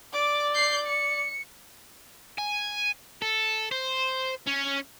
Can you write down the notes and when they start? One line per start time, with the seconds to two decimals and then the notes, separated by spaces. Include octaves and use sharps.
0.13 D5 D6
0.54 G6 C7
0.87 C#7
2.38 G#5
3.22 A4
3.72 C5
4.47 C#4